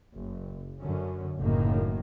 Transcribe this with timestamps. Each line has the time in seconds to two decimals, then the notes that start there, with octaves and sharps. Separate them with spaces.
0.14 F#1
0.81 F#2 D3 C#4
1.38 F#1 A2 D#3 A#3